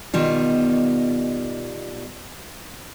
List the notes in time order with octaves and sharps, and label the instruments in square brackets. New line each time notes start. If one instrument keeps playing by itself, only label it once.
[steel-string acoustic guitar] B2 D#3 G3 F4